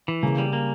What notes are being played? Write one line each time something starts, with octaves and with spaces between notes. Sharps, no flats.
E3
C#3 A#3
G3
A#3